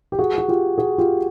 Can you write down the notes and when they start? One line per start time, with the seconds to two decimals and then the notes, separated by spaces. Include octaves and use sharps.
0.12 G4
0.19 F#4 G#4
0.38 F#4
0.48 F4 G4
0.78 F#4 G#4
0.98 F4 G4